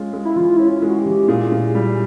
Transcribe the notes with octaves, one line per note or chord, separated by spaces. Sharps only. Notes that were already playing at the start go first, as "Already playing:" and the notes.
Already playing: G#3 C#4 F4
G#3
E4
E3 F4
C#4 E4
F4
G#3
F#4
G4
E3
A#2 G#4
A#2
G3